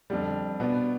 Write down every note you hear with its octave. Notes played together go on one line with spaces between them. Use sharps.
F2 D3 G3
B2 B3 D4